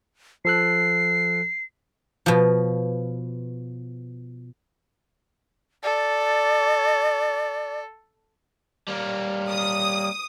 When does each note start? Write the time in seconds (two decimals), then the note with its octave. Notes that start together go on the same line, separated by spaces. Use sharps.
0.45 F3 A4 F#6 C7
2.26 B2 F3
5.83 A4 D5
8.88 G3 A#3
9.49 D#6